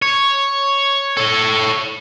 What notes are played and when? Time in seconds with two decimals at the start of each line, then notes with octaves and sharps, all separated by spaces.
0.02 C#5
1.17 A4 C#5